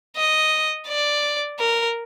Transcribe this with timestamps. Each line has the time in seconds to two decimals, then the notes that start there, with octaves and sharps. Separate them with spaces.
0.17 D#5
0.88 D5
1.60 A#4